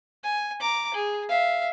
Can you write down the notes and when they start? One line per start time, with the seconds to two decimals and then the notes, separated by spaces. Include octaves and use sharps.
0.24 G#5
0.60 A#5 D6
0.94 G#4
1.28 E5 F5